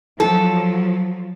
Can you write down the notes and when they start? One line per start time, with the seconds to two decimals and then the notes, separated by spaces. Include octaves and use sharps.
0.20 F3 F#3 A4